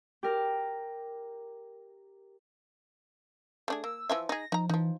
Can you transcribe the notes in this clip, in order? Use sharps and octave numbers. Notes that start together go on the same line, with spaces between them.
G4 A#4
A3 D4 G#4
A#3 E6
E3 F3 E5
D#4 G#4 A#6
F3 D#4 A#5
E3 F3 D#4